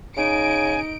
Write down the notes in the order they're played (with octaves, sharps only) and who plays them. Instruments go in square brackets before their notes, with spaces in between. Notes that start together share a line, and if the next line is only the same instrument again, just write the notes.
[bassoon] C#3 [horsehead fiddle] D#4 [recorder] G#5 [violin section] D7